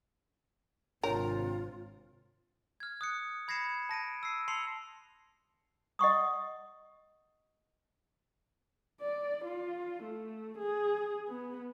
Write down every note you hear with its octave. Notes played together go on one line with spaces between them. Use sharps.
G#1 C3 D4 F4 A#4 C#5
F6 G#6
D#6 F#6 C#7
B5 G#6 A#6 C7 C#7 E7
A5 A#6 D7 D#7
E6 C7 D#7
A5 C6 C7 C#7 F7
D#5 F#5 C#6 D#6
D5
F4
A3
G#4
B3